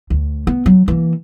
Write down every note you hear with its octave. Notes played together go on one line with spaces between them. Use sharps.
D2
B3
F#3
E3 A#3